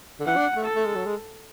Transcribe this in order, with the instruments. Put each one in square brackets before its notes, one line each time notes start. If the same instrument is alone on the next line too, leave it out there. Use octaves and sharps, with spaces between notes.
[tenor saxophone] D3
[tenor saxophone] E3 [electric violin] F#5
[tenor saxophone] D4
A3
[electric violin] A4
[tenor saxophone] A3
G#3
F#3
G#3